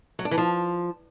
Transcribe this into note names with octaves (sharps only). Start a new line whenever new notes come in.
F#3
D4
E3
F3